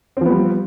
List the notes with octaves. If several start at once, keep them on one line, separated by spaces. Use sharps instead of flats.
F3 G3 B3 C4